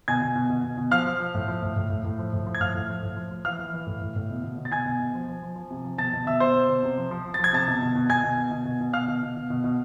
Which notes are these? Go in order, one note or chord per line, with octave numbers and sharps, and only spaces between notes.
B2 G#5 G#6
B2
B2
B2
B2
B2
F3 F5 F6
F3
F3
A2
F3
A2
A2
A2
A2
F3
A2
F3
G#6
A2 F5 F6
A2
F3
A2
F3
F3
E3 F5 F6
E3
E3
A2
A2
A2
B2
B2
B2
A6
B2 G#5 G#6
B2
B2
F3
F3
F3
F3
C3
F3
B2 A5 A6
B2
B2 E5 E6
B2 C5 C6
B2
B2
C3
F3
F3
F3
A6
F3 G#6
C3 A5 A6
B2
B2
B2
B2 G#5 G#6
B2
B2
B2
B2
B2
B2 F5 F6
B2
B2
B2
B2
B2